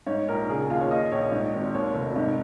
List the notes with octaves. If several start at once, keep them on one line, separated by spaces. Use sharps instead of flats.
G#2 C#5
A#1 A#4
C#3 G#4
D#2 F4
C#5
A#2 D#5
A#1 C#5
G#2
G#1
D#2 C#5
F1
G#2